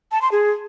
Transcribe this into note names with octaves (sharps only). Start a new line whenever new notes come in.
A5
C6
G#4